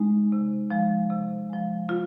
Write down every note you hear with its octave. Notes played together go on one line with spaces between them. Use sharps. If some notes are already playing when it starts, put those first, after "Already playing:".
Already playing: G#3 D#4
C3
F3 G#3
C3
F3 G#3
C3 F4